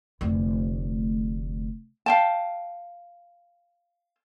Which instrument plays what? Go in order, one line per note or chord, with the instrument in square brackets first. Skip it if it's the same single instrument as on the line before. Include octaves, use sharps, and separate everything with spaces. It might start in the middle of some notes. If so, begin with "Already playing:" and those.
[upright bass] F1 D2
[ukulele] F5 G5 A5